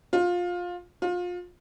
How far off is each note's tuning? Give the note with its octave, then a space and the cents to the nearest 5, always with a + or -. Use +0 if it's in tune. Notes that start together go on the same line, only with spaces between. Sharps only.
F4 +20
F4 +30